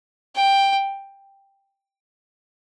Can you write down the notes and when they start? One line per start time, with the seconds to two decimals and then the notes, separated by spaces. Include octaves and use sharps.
0.36 G5